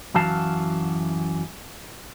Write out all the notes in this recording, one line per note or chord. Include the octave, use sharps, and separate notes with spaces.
F#2 E3 F#4 F5 A5